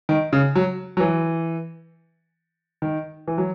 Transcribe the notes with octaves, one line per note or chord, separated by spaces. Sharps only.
D#3
C#3
F#3
F#3
E3
D#3
E3
F#3